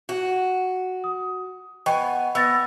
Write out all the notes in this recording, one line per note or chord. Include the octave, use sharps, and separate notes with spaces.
F#4
D#6
B3 D#5 G5 G#5 C#6
B3 E6 A6 A#6